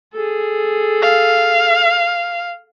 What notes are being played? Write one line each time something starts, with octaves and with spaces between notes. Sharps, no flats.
G#4 A4
F5